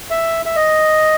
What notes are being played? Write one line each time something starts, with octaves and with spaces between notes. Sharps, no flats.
E5
E5
D#5